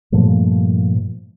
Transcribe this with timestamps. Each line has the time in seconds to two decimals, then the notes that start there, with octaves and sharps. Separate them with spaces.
0.12 G2 A#2 F3 A3